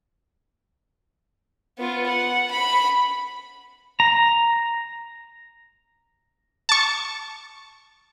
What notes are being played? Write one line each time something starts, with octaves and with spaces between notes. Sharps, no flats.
B3 F4
F#5
B5
A#5
A5 C#6